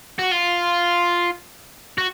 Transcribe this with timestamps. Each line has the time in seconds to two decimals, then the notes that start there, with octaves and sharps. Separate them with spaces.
0.19 F#4
0.32 F4
1.98 F#4